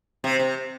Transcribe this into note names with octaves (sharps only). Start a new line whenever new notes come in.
C3
C3